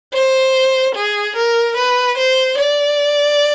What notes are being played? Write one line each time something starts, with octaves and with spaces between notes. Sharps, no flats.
C5
G#4
A#4
B4
C5
D5